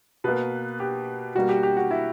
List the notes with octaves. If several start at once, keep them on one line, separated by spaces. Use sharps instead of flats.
B2 A#3 B4
G4
B2 G3 A#3 F#4
G4
G4
F#4
E4